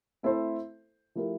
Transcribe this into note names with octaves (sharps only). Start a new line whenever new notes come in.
A3 C4 E4 A4 C5
F3 A3 E4 G4 A#4